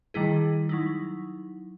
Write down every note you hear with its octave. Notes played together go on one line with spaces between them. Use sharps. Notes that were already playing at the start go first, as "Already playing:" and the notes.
D#3 G3 A3 E4 G#4
F#3 D#4 E4